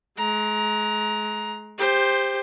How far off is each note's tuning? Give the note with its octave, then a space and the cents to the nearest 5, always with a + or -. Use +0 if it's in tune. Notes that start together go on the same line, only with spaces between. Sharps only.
G#3 +35 A#5 +10
G4 +20 C5 +0